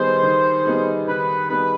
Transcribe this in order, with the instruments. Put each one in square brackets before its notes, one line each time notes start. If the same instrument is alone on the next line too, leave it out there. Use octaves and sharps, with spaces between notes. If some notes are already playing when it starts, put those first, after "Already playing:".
Already playing: [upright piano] D#3 G3 B3 D#4 G#4 [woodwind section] C5
[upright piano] D#3
G3 B3 D#4 G#4
[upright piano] D#3 [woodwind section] B4
[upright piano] G3 B3 D#4 G#4 [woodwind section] B4